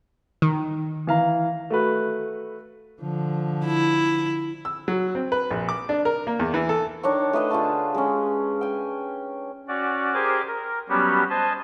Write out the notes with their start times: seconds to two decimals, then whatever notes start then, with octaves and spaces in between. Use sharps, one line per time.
0.42 D#3
1.07 E3 F5 A#5
1.70 A3 F#4 B4
3.01 D3 F3
3.65 E4
4.65 E6
4.88 F#3
5.15 C4
5.32 B4
5.51 A#1
5.69 D6
5.89 D4
6.05 A#4
6.27 A#3
6.39 E2
6.54 E3
6.69 A4
7.03 D#3 D4 C#5 C#6
7.33 A3 B4 D#5 C6
7.50 D3 F4 G#4 A5
7.94 G#3 C#4
8.61 G5 G#5
9.68 C#4 F#4 D5
10.14 G4 G#4 A#4 C5 G#5 D6
10.47 A#4
10.89 F#3 G3 B3 C#4 F#4 G4
11.30 C5 D#5 G#5 A5